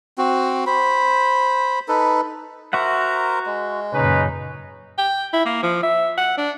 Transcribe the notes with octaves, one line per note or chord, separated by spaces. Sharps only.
C4 F#4
C5 B5
D#4 A4 B4
F#4 A#4 C5 E5 F#5 A#5
G#3
F#2 A#2 C#3 C#4 D#4 B4
G5
E4
A#3
F3
E5
F#5
D4